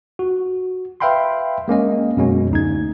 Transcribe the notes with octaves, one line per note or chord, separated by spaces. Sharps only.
F#4
B4 E5 F5 G5 B5 C6
G#3 A#3 C#4 D#5
F#2 B2 G#3 C#4
D2 D#4 G#6